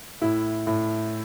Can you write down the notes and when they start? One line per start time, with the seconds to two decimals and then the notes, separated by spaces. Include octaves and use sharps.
0.22 A2 E4
0.67 A2